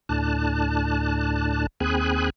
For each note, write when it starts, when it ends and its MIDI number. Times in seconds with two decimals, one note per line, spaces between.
0.09 1.67 38
0.09 1.67 45
0.09 1.67 62
0.09 1.67 81
0.09 1.67 90
1.80 2.30 39
1.80 2.30 60
1.80 2.30 68
1.80 2.30 80
1.80 2.30 83
1.80 2.30 90